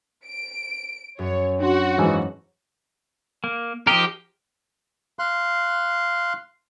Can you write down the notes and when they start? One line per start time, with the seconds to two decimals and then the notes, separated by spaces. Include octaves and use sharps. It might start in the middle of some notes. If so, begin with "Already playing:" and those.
0.25 D7
1.19 F#2 C#5
1.60 D4 F#4 C6
1.98 G#2 E3 G#3 F5 G#5 A5
3.44 A#3
3.87 F3 D#4 G4 A#4
5.19 F5 C6 F#6